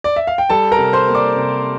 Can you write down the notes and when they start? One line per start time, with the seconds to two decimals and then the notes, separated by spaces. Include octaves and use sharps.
0.04 D5
0.16 E5
0.27 F5
0.38 G5
0.50 G3 A4 A5
0.72 A#4 A#5
0.78 C3
0.93 C5 C6
1.08 A#3
1.15 D5 D6
1.36 C3